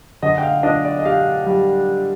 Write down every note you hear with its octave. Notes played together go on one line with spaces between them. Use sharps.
D3 D#5
G5
F5
D4 D#5
D5
D#5
G4 F5
G3